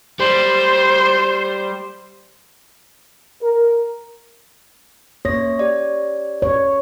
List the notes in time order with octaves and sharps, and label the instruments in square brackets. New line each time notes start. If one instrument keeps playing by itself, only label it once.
[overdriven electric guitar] G3 [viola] C5
[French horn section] A#4
[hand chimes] A#3 A#6 [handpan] C#5
[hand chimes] G4 D5
[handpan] C#5